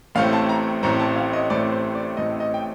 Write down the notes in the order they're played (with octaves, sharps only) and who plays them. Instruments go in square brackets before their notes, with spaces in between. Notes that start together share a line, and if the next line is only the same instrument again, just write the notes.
[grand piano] A1 A2 A3 C4 F5
A5
A#5
A1 A2 A3 C4 A#5
A5
F5
D#5
A1 A2 A3 C4 D5
C5
D5
A1 A2 A3 C4 D#5
D#5
G5